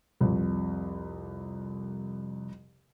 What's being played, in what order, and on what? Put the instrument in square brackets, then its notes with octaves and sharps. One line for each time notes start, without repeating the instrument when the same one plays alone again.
[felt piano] C2 F2